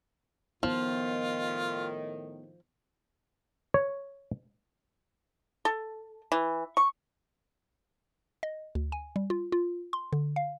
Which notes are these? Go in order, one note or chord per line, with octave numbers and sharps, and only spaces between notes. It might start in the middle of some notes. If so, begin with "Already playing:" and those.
A2 D#3 F3 B3 F4
C#5
A4
E3
C#6
D#5
D2
G#5
G3
F4
F4
C6
D3
F5